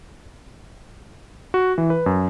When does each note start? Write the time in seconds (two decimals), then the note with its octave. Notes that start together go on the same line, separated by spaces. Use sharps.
1.54 F#4
1.78 E3
1.90 B4
2.06 F#2